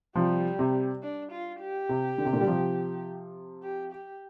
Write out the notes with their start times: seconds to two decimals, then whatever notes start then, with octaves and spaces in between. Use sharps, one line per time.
0.15 C3 F3 G3
0.59 C3
1.03 D4
1.32 F4
1.60 G4
1.89 C3
2.18 D3
2.25 C3
2.33 A#2 D3
2.41 G3
2.47 C3 F3
3.63 G4
3.92 G4